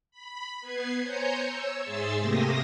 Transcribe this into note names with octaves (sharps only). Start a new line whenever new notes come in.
B5
B3 B4 G#6 C7
C5 C#5 G#5 A#5 C#6 G6
C#5 E6
G#2 G#4 E5 C6 E6 A6
C3 A3 A#3 G4 D#6 A#6